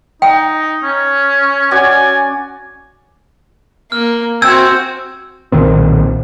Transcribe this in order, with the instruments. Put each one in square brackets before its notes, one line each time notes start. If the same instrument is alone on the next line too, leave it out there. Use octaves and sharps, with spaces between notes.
[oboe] D#4 [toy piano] G5
[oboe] C#4
[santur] C#4 F#4 D5 [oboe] G#5
[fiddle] A#3 [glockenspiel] F6
[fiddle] C4 F#4 [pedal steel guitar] E5 G5 G#5 [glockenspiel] E6
[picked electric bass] B1 A#2 D#3 C4